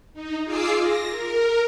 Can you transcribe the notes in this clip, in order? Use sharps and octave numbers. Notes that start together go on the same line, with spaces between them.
D#4
F4 G#4 D6 E6 C7
A#6
A#4